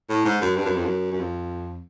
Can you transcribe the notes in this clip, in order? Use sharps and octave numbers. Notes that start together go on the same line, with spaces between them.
A2
G#2
F#2
G2
F#2
F2
F#2
F#2
F2